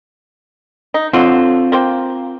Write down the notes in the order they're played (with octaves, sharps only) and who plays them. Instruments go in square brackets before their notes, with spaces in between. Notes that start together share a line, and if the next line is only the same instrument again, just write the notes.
[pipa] D#4
[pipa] D3 F#3 [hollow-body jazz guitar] C4 F4
[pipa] A#3 C5 G5